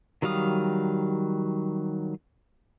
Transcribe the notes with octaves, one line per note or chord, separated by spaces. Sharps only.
D#3 F#3 G3 F5 D#6